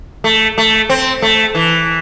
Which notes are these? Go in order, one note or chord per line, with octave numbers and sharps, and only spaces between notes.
A3
A3
C4
A3
E3